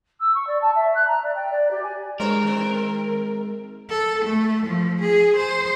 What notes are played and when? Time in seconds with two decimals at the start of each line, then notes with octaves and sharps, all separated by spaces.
0.19 E6
0.34 C#6
0.47 D5
0.61 A5
0.75 E5
0.95 F#6
1.07 A#5
1.23 D5
1.35 G5
1.50 D5
1.70 G4
1.83 G#5
2.20 G2 G#3 A#4 C5 C#5
2.43 D#3 C4
3.90 A4
4.25 A3
4.66 F3
5.02 G#4
5.37 C5